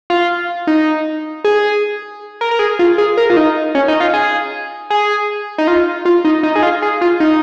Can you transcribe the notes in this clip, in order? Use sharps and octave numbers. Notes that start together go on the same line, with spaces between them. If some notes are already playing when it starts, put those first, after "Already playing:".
F4
D#4
G#4
A#4
A#4
G#4
F4
G#4
A#4
F4
D#4
C#4
D#4
F4
G#4
G#4
D#4
F4
F4
D#4
D#4
G#4
F4
G#4
F4
D#4